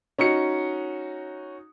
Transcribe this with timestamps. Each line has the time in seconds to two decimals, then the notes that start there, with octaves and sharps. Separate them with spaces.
0.19 C#4 D#4 F#4 C#7